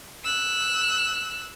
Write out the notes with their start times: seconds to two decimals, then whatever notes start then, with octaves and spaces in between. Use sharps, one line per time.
0.24 E6 F#6